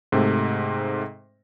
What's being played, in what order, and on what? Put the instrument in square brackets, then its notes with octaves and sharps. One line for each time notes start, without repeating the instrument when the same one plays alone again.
[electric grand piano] G#2 C3 A3 C4